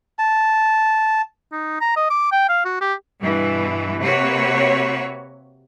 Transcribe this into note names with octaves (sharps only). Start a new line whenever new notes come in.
A5
D#4
A#5
D#5
D6
G5
F5
F#4
G4
G2 B2 E3
C3 A#3 F#4 B4 C#5